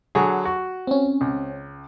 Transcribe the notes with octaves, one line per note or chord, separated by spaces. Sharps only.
D3 F#3 G#4
F#4
C4 C#4
C#2